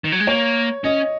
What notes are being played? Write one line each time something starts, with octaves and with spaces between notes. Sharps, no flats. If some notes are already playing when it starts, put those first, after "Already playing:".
D#3
F#3
G#3
A#3 C#5
C#4 D#5